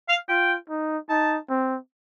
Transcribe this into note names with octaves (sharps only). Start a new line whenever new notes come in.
F5
F4 G5
D#4
D#4 A5
C4